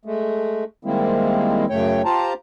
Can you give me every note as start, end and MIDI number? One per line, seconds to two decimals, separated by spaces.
0.05 0.64 56
0.05 0.64 57
0.85 1.65 51
0.85 1.65 55
0.85 1.65 56
0.85 1.65 58
0.85 1.65 60
0.85 1.65 64
1.70 2.02 42
1.70 2.02 49
1.70 2.02 57
1.70 2.02 73
1.70 2.02 79
2.05 2.33 65
2.05 2.33 67
2.05 2.33 72
2.05 2.33 81
2.05 2.33 82